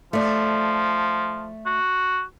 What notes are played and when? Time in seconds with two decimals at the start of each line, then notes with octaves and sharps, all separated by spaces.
0.13 F3 A3 D5
1.66 F#4